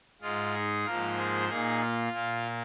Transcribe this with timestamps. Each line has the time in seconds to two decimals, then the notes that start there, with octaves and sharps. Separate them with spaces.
0.21 G#2 G#3 F4
0.53 D#4 G#4
0.85 G#2 F3 A#3 F4 A#4
1.17 G#4 C5
1.48 A#2 A#3 D#4 G#4
1.80 F4
2.12 A#2 A#3